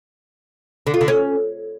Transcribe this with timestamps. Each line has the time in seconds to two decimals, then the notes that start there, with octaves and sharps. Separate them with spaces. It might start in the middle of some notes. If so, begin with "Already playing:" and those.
0.87 D3
0.94 F4
1.01 D3
1.08 C#4